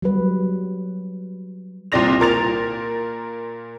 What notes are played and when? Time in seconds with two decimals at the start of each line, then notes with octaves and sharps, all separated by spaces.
0.02 F#3 G3 B4
1.92 C2 A#2 C4 D5 A#6 F7
2.20 A#2 A#4 A6 F7